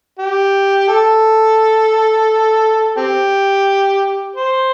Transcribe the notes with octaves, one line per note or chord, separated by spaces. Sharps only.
G4
A4
C4 G4
C5